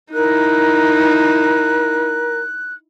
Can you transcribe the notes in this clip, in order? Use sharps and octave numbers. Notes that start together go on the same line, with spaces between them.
D#4 E4 A#4 F#6